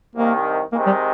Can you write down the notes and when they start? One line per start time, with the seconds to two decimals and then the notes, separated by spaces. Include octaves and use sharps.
0.16 C2 C3 D#3 A#3
0.72 C3 D#3 G#3 A#3
0.86 G3